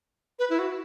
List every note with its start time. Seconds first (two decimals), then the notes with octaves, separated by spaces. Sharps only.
0.39 B4
0.50 E4
0.59 F#4